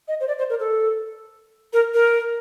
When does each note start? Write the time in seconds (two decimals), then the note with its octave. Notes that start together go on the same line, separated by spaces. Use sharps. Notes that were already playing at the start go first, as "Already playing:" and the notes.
0.08 D#5
0.20 C5
0.28 D5
0.38 C5
0.50 A#4
0.59 A4
1.73 A#4
1.94 A#4